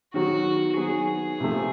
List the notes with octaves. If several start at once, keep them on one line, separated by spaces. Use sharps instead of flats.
D#3 F#3 B3 F#4
D#3 F#3 B3 G#4
C3 F3 A3